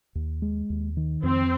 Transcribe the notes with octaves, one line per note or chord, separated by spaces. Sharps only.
D#2
G#3
D#2
D#3
F2 C4